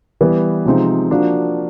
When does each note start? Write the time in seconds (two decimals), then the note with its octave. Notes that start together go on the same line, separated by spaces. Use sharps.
0.21 E3 G3 B3
0.65 C3 F3 G#3 C4 D#4
1.11 F3 A#3 D4 F#4 A#4